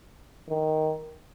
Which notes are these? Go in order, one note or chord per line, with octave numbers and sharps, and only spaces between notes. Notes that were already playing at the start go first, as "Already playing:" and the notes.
D#3